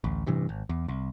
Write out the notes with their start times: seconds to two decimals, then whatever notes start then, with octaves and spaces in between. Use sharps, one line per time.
0.04 A1 D2
0.27 A1 G2 C3 E3
0.49 G#1
0.69 E2
0.88 C2